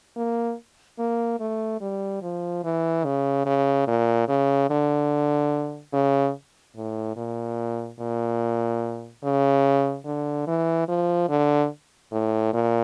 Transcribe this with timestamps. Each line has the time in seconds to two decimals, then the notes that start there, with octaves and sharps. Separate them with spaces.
0.16 A#3
0.99 A#3
1.40 A3
1.81 G3
2.22 F3
2.64 E3
3.05 C#3
3.46 C#3
3.87 A#2
4.28 C#3
4.70 D3
5.93 C#3
6.76 A2
7.17 A#2
8.00 A#2
9.24 C#3
10.06 D3
10.47 E3
10.88 F3
11.29 D3
12.12 A2
12.53 A#2